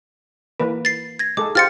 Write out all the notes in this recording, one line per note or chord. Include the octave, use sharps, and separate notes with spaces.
E3 A#3 B4
A6 C7
G#6 A#6
G#3 G#4 A4 D6
F4 G4 C5 F6 A6 C#7